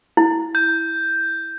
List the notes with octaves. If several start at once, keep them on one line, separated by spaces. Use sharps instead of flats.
E4
G6